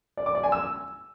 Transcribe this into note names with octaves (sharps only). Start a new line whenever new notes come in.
D5
D6
D5
G#5
E6